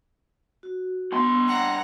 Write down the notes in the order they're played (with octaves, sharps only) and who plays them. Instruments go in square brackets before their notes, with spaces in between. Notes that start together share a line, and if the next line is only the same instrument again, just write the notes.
[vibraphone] F#4
[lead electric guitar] G2 C6 [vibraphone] B3
[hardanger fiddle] F#5 A#5 [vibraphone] G5